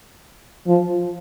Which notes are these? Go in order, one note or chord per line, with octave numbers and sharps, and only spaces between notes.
F3